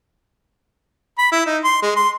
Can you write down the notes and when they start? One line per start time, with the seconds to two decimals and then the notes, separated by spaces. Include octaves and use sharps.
1.18 B5
1.32 E4
1.46 D#4
1.64 C6
1.82 G#3
1.96 C6